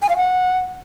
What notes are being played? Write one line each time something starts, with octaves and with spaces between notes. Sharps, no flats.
G#5
F5
F#5